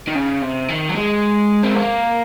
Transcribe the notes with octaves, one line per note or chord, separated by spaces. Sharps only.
D#3
C#3
C3
D#3
F#3
G#3
C4
A#3